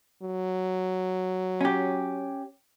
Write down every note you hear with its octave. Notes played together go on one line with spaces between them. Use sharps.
F#3
C#4 G4